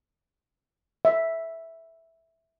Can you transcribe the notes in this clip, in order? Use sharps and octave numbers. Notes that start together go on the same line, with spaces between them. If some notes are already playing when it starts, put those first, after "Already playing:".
E5